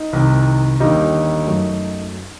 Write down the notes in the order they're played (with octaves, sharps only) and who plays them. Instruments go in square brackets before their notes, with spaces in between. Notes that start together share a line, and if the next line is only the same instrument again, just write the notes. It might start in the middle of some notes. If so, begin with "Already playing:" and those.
Already playing: [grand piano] D#4
C2 C3 D#3
D#2 D3 G3 D#4
F#2 F#3 A3